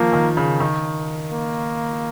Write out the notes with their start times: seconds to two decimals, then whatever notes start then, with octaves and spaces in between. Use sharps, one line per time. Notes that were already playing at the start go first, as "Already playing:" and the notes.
Already playing: D#3 F3 A#3
0.13 D#3
0.37 C#3
0.60 D#3
1.32 A#3